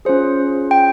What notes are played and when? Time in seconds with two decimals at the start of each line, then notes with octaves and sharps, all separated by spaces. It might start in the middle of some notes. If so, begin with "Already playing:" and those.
0.05 C#4 F4 G#4 C5
0.71 G5